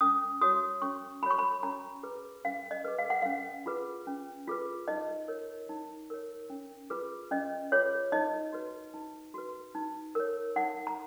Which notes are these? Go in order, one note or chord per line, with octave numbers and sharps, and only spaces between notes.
C#4 D#6
F#4 C#5 D#6
C#4 C#6
F#4 C#5 B5 C#6
B5
C#4 A#5
G#4 B4
C#4 F5
D#5
G#4 B4
F5
F#5
C#4 F5
F4 G#4 B4
C#4
F4 G#4 B4
D#4 D#5
A#4 C#5
D#4
A#4 C#5
C#4
F4 G#4 B4
C#4 D#5
F4 G#4 B4 C#5
D#4 D#5
F#4 B4
D#4
F#4 B4
D#4
A#4 C#5
D#4 F#5
A#5